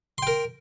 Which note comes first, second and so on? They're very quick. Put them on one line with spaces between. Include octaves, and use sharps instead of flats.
C6 G5 A#4